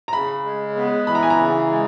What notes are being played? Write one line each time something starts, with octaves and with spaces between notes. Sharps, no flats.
A#5
C#3 B5
G#3
B3
E3 B5
A#5
G#5
A#5
C#3
G#3